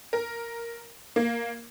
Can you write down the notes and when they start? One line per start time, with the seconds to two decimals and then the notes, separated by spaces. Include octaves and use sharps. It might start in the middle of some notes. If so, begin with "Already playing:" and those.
0.13 A#4
1.16 A#3